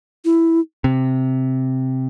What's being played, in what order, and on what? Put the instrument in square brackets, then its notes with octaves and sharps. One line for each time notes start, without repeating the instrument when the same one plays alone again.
[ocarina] E4
[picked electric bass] C3